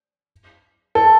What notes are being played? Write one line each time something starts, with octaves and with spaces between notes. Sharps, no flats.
A4